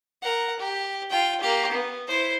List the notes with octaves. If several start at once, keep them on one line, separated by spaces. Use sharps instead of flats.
A#4 F#5
G4
F4 G5
A#3 G4
B3
E4 C5